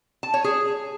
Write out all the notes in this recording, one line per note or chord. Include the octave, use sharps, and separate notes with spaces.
A5
C#5
G#4